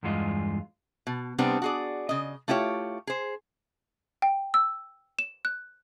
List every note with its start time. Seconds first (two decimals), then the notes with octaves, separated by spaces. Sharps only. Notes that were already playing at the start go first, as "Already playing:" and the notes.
0.03 E2 G2 G#3 F4 D#5
1.07 B2
1.38 C3 G3 B3 C4 D4
1.62 F#4 G#4 D5
2.09 C#3 D#5
2.48 A3 E4 F4 G4 C#5
3.07 G#4 C5
4.22 G5
4.54 E6
5.19 E7
5.45 F#6